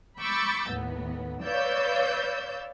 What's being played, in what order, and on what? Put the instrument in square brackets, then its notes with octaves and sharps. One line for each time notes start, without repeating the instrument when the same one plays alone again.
[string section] B5 C#6 D6 E6 G6 A6
D#2 A2 B3
B4 C#5 D5 F5 E6 G6